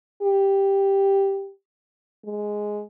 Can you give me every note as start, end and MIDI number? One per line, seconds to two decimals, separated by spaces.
0.22 1.50 67
2.25 2.82 56